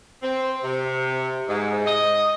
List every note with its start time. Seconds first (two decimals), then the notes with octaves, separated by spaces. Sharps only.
0.22 C4
0.64 C3
1.48 G#2
1.85 D#5